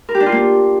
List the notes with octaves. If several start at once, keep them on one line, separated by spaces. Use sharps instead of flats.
A#4
G4
D4
F4
A#3